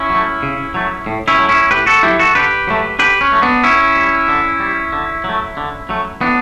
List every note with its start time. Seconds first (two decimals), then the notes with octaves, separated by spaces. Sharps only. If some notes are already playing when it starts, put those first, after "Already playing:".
Already playing: C#4 E4
0.10 F#3 A3
0.42 C#3
0.74 F#3 A3
1.06 A2
1.28 C#4 E4
1.38 F#3 A3
1.49 C#4 E4
1.71 A2 G4 B4
1.86 F#4 A4
2.03 F#3 A3 E4 G4
2.19 F#4 A4
2.35 D3 G4 B4
2.67 F#3 A3
2.99 D3 G4 B4
3.21 C#4
3.32 F#3 A3
3.42 B3 D4
3.64 D3 C#4 E4
3.96 G3
4.28 D3
4.60 G3
4.93 D3
5.24 F#3 A3
5.57 D3
5.89 F#3 A3
6.21 A2 B3 D4